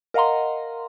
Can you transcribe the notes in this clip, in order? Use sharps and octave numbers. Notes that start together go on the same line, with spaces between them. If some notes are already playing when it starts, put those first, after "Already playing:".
A#4 D#5 F5 F#5 A#5 C6